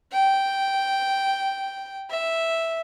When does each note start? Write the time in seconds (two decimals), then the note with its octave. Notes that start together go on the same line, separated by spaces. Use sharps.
0.12 G5
2.10 E5